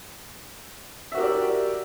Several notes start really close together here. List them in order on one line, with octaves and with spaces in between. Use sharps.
E5 F#4 A#4 G4 D5